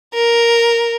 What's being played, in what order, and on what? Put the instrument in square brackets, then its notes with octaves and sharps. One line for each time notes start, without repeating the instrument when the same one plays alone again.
[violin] A#4